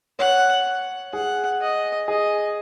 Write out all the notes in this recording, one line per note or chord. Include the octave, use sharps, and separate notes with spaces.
C#5 F#5
G#4 F#5
D#5
G#4 D#5